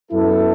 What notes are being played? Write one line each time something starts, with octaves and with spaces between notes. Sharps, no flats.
F#2 F#3 B3 E4 A4